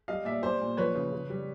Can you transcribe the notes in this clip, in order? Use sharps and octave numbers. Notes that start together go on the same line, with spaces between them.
G3 D#5 F5
A#2 D5 E5
G3 C5 D5
A#2
F3 B4 C#5
C#3
C#3
G3